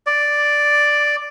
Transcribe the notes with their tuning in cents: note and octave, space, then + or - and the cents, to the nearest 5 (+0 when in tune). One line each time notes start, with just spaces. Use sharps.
D5 +0